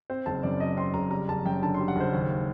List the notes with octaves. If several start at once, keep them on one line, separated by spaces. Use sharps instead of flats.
C4 C5
F#1 A5
F#2 D5
F#3 D#5
C4 C6
F#1 A#5
G3 A#5
F#1 A5
F#2 G5
D3 A5
C6
G3
F#5
F#1 C5
D#2